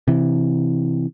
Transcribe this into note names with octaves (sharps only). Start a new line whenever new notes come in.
C3 E3